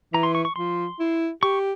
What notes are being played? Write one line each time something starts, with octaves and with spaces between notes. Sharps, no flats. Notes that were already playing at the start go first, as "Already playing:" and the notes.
E3 A#5
C6
C#6
C#6
F3 C6
E4
G4 C#6